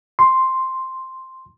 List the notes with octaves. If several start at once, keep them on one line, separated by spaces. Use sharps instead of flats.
C6